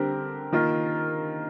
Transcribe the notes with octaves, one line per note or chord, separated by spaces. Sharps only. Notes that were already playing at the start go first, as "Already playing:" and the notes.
Already playing: D3 G3 C4 G4 A#4
D#3 A#3 F4 A#4